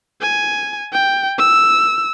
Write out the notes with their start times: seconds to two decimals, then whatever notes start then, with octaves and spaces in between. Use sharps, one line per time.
0.22 G#5
0.93 G5
1.38 E6